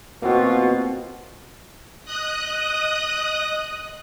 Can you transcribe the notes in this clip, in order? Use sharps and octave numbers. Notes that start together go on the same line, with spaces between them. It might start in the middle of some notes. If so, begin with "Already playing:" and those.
B2 A#3 C4 F4 F#4
D#5 D#6 F#6